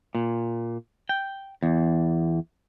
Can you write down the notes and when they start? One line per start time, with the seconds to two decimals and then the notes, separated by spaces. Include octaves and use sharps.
0.15 A#2
1.09 G5
1.63 E2